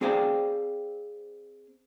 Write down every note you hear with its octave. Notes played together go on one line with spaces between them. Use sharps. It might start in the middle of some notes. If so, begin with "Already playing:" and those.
C4 G#4 C5 D5 F5 G5